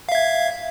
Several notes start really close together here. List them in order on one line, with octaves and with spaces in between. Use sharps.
F5 E5 G#6